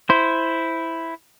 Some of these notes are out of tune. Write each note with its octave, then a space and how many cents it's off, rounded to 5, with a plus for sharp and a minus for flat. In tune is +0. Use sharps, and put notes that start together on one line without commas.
E4 +0 C5 -5